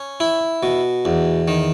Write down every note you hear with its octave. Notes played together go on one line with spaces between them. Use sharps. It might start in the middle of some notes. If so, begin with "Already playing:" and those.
Already playing: C#4
E4
B2
E2
D#3